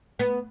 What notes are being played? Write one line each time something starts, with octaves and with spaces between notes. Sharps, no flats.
B3